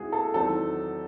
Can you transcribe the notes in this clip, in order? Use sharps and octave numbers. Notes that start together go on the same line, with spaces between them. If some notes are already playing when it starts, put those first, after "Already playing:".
Already playing: C#2 C#3 G#3 C4 E4 F#4 G#4
A4
E2 D#3 F#3 C4 D#4 A4